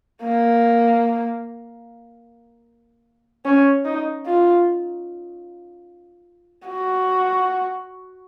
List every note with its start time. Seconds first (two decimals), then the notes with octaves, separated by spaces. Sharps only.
0.23 A#3
3.45 C#4
3.85 D#4
4.26 F4
6.67 F#4